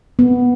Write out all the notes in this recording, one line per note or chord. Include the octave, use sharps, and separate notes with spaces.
B3